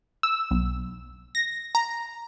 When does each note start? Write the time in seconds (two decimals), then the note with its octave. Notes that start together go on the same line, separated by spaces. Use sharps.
0.23 E6
0.51 B1
1.35 A#6
1.75 A#5